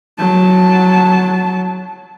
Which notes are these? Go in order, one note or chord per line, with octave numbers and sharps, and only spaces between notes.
F#3 A5